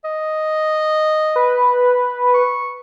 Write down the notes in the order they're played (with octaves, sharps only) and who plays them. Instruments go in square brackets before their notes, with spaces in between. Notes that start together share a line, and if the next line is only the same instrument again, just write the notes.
[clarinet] D#5
[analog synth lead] B4
[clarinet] C#6